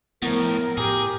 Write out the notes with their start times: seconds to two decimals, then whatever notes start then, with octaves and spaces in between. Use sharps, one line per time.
0.22 A2 F3 B3 A#4
0.78 A2 G4 G#4